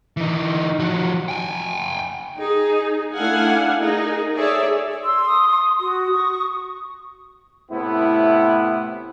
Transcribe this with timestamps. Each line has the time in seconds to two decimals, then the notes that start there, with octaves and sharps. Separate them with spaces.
0.17 E3 D#4
0.79 F3 F#4
1.28 G5 G#5
2.36 D#4 G#4
3.15 A3 D4 E4 F5 F#5 G#5
3.81 D#4 G#4 A#4
4.35 G#4 A4 C#5 D5 E5
5.04 C6 E6
5.26 D#6
5.80 F#4 D#6
6.13 C#6
7.71 A2 C3 B3 E4